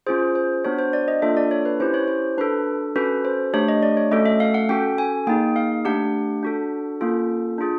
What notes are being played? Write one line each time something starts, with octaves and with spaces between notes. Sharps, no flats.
C#4 F4 G#4 C5
C5
B3 D4 F#4 C#5
C5
D5
D#5
A#3 D4 F4 A4 E5
D5
C#5
B4
C#4 E4 G4 C5
C#5
C5
D4 F#4 A4 B4
C#4 F#4 A4 B4
C5
A3 D4 G4 C#5
D#5
D5
C#5
A3 C#4 F#4 A4 D#5
E5
F5
F#5
C#4 F#4 A4 G5
G#5
A#3 D#4 G#4 G5
F5
A3 D4 G4 F#5
D4 F#4 A4
A#3 C#4 F4 A4
D4 F4 G#4